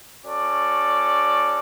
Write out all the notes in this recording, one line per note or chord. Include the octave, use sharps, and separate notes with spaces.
C#4 F#4 A4 D5